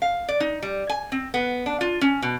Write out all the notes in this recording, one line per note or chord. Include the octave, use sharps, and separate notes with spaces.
F5
D5
D#4
G3
G#5
C4
B3
D4
F4
C#4
B2